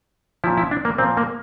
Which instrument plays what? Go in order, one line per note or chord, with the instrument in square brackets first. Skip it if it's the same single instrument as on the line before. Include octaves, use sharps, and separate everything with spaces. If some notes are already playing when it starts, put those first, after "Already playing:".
[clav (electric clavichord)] F3 E4
A#2
E4
D4
A#3
A#2 F3 C4
A#3